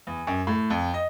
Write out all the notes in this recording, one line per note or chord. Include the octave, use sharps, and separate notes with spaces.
E2
F#2
A2
F2
D#5